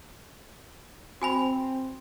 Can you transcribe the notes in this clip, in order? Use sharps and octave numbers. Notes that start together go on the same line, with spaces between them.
C4 F#4 G#5 B5